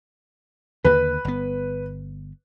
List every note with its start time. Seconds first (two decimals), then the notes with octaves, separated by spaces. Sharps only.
0.85 D#2 D3 A#3 B4
1.25 G1 B3